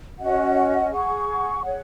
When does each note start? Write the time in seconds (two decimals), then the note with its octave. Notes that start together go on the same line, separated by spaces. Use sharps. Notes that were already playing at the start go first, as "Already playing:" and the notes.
0.19 C#4 F#4 D#5 F#5
0.90 G#4 F#5 C#6
1.62 G#4 C#5 F#5